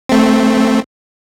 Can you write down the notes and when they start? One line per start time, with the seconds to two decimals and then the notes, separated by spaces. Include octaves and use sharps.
0.09 A3 C4